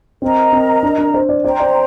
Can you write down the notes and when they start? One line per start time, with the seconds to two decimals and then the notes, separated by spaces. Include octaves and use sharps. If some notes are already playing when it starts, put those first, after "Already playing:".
0.22 C4 A#4 D#5 A#5
0.52 C4
0.83 D4
0.98 D4
1.14 C5
1.29 D5
1.44 C5 D5 G5 A#5
1.60 D5